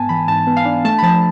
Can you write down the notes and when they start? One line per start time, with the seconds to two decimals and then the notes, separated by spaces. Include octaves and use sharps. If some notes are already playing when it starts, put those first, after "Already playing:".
Already playing: G#2 B3 G#5 A5
0.09 E3 B5
0.28 G#2 A5
0.47 B3
0.57 F5
0.65 D4
0.85 A3 A5
0.98 B5
1.03 F3 A5